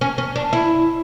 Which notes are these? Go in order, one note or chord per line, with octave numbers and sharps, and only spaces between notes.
C#4
C#4
D4
E4